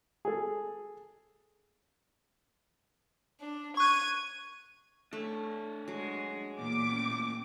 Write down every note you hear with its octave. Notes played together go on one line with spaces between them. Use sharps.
G#4 A4
D4
C#6 F#6 G#6 D#7
A3 D4 C#5
F#3 G#3 G#4
E2 A#2 D6
A3 C#4